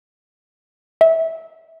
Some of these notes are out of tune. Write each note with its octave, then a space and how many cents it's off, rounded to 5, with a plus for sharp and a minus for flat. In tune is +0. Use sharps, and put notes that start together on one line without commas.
E5 -20